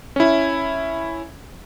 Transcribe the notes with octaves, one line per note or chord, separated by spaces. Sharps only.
C#4 E4